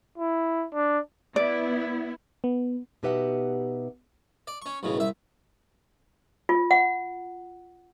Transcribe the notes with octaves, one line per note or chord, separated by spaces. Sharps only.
E4
D4
B3 E4 D5
B3
B2 D#4 G4 B4 E5 F#5
D5
C#4 C#6
B1 A2 C#3
C2 E5
F4
F#5